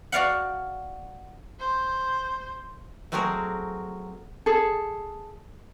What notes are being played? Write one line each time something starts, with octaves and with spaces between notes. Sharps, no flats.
F#4 D5 F5 F#5
C5
F#3 A3 C4 F#4 G#4 A#4
G#4 A4